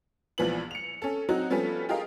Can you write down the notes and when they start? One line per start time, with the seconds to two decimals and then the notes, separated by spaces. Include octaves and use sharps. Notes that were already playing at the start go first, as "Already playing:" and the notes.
0.38 A#1 E3 F3 B3 F#7
0.71 C#7 F7
1.02 C#4 A4
1.29 F#3 C4 D#4 F#4
1.50 F3 G3 B3 C#4 A4
1.89 F4 G4 G#4 A#4 D#5 F5